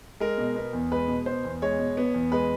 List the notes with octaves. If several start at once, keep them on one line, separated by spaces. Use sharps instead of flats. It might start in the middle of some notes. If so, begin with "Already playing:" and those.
G#3 A#4
B2
B3
E2
G#3 B4
B2
B3 C5
E2
G#3 C#5
B2
B3
E2
G#3 B4